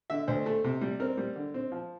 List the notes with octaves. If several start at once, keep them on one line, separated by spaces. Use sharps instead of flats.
D3 E5
D2 C5
A3
C3
G3
C4 A#4
G3
D3
C4
F3